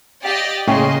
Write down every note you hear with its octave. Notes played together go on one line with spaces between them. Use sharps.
G4 D5 D#5 F5 F#5
A2 C#3 A#3 D#5 F#5 G5 C6 C#6